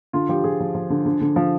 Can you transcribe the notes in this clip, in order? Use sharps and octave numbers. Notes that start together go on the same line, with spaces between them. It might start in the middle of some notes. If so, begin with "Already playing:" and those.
D3 F4
F3 G4
F3 G#4
F3
F3
D3
D3
D3
F3